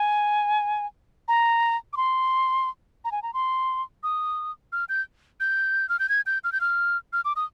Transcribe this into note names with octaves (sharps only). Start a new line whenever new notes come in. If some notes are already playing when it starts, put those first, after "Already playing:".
Already playing: G#5
A#5
D6
C6
A#5
G#5
A#5
C6
D#6
F6
G6
G6
F6
G6
G#6
G6
F6
G6
F6
F6
D6
D#6